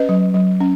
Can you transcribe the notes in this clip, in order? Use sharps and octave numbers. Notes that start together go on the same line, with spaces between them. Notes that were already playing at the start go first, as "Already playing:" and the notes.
Already playing: C#4 B4 D#5
F#3
F#3
C#4